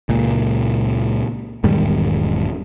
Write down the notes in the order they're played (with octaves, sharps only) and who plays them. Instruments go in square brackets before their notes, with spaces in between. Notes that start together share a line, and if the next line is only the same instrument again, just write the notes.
[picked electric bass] C#2 A#2
E1 G#2 D#3 G3